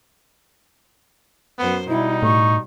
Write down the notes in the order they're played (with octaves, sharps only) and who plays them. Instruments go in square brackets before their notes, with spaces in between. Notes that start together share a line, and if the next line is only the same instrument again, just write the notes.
[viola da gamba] F#2 C5 [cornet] B3
[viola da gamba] B2 G3 [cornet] D#4 [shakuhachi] E4
[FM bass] A2 [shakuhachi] C#6